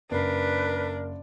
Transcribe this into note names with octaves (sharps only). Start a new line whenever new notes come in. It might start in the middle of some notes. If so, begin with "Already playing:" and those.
F#1 D4 A#4 B4 C7